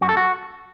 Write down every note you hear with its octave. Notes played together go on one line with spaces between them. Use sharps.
F#2 F#4
A4
F#4